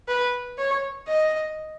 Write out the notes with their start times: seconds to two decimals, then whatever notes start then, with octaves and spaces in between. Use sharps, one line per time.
0.08 B4
0.58 C#5
1.08 D#5